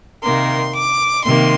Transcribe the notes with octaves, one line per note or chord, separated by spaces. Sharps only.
C3 D#3 A#3 C6
D6
C3 D#3 A#3 C6